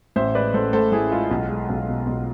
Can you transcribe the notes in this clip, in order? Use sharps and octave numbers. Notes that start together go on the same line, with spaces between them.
A1 C5 E5
G#3 B4 D5
A1 A4 C5
A2 A4 C5
A1 E4 G#4
G#3 F4
B1
G#3
B1
B2
B1